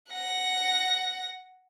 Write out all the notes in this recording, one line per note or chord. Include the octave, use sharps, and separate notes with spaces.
F#5 A#6